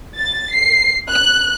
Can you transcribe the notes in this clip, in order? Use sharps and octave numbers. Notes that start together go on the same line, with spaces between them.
A6
C7
F#6